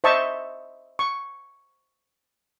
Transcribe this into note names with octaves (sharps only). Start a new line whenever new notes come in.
C5 D#5 E5 A5 C#6
C#6